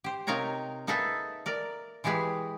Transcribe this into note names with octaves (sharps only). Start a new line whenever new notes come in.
G4 C5
C3 D#4 F4 A#4 C#5 A#5
A#3 D#4 G#4 A4 B4 E5
A#4 D5
E3 G#3 G4 G#4 B4